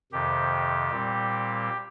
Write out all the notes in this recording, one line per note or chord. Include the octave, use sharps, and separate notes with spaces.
F2 C3 D#3 G4
A#2 G3 C4